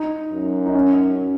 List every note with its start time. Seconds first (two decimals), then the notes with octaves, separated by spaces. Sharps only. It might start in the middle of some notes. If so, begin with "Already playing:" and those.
Already playing: D#4
0.32 F#2
0.66 D#4
0.75 C#4